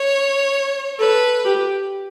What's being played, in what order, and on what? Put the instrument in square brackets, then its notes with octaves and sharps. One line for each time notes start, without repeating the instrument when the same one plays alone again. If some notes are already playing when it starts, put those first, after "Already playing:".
Already playing: [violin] C#5
[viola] A4 [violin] B4
[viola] G4